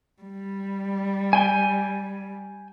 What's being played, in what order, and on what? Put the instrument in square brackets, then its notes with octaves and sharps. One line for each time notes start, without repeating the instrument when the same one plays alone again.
[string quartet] G3
[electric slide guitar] G5 G#5